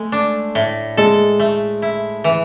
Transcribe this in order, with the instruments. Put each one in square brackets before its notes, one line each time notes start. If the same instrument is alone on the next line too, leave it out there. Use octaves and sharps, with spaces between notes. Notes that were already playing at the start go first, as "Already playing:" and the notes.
Already playing: [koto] G#3 [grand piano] A3
[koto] D4
A2
[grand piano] G#3 [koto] A4
[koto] A3
E4
E3